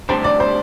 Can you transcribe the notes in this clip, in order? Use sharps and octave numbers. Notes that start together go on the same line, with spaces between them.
D2 C3 G3 D4 C5
D5
C5